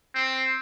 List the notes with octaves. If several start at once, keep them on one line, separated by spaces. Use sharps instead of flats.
C4